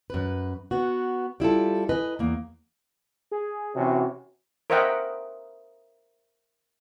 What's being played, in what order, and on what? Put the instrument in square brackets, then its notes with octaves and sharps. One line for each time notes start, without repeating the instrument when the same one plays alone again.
[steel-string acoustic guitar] F#2 B4
B3 F#4
G3 E4 F4 A4
B4 D#5 G#5
E2 A#3
[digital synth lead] G#4
[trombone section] C3 E3 C#4 [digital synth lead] F#4
[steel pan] A#4 C5 D#5 E5 F#5 G5